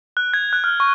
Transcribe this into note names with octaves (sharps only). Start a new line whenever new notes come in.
F#6
G#6
F#6
F6
C#6